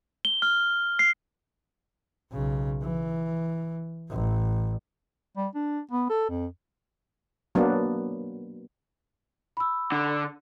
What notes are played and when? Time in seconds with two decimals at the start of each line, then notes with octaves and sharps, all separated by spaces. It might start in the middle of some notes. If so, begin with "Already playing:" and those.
0.25 G7
0.42 F6
0.99 C7
2.33 B1 C#3
2.82 E3
4.10 A1
5.37 G3
5.55 D4
5.91 B3
6.10 A4
6.29 F2
7.55 F#3 A#3 B3 D4
9.57 B5 E6
9.92 D3